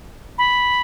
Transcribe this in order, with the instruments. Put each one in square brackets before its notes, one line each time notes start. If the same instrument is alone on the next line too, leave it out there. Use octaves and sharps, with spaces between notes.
[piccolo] B5